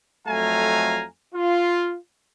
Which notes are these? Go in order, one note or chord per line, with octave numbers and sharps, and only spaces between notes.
F2 F#3 A3 F5 G#5 A#5
F4